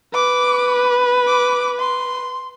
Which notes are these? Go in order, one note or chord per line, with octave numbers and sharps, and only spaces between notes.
B4 D6
D6
C6